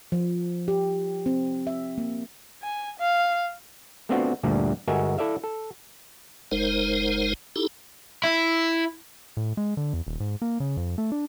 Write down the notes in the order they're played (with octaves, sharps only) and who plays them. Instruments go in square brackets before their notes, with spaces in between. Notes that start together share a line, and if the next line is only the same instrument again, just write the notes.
[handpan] F3
G4
C4
E5
A#3
[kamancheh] G#5
F5
[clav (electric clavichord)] A3 B3 C4 D4 F4 F#4
D2 G2 A#2 G3
G1 G#3 F#4 A#4 E5 G#5
E4 A4 D5 E5 F5
A4
[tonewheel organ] F#1 G#3 D#4 A#4 C5
D#4 E4 G4 A4
[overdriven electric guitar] E4
[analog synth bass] A2
G#3
D3
E2
D#1
G#2
A#3
C#3
F2
A3
D4